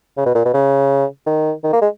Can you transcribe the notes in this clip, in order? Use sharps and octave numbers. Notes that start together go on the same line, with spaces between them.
C#3
B2
A#2
B2
C#3
D#3
D#3
A#3
G#3